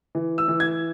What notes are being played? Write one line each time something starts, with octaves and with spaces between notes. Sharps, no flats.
E3
E6
E3
G#6